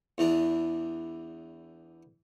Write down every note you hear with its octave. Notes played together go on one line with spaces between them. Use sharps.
E2 E3 D4